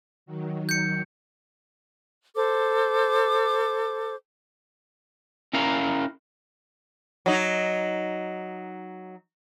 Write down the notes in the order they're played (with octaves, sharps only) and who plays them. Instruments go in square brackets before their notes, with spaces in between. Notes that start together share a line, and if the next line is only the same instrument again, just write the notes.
[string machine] D#3 F#3
[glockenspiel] G6 C#7
[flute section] A4 C5 D6
[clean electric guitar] C#4 E4 A#4 F5 A#5
[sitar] F#3 D#4